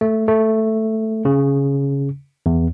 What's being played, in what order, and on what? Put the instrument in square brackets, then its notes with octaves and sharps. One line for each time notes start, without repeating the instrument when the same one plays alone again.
[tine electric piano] A3
A3
C#3
E2